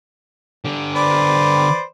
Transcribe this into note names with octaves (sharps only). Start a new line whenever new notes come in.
D3 G4
B4 C5 D5